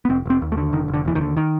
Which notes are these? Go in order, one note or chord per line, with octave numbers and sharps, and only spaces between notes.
B3
F1 C4
F1 C4
D#2
A3
D3
F1 D#3
F1
D3
D#2 E3
D#3
D3
D#3